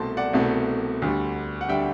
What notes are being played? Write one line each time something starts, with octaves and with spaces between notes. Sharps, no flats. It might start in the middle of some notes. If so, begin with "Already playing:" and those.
Already playing: C2 B2 A3 C4 A5 C6
D5 F#5
C2 B2 A3 C4
D2 D3 G3
F#5
D3 G3 E5 G5